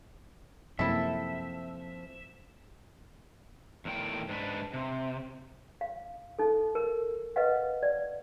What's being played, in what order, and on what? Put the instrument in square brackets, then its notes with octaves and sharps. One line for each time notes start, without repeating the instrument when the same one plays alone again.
[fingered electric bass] F#2 C3 [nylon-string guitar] F3 A#3 C4 [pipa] E4 A4 [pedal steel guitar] E5
[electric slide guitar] E2 A2 D#3 G5
G#2 D4 B4
C3
[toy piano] F5
D#4 A4
A#4
B4 D#5 F5 F#5
D5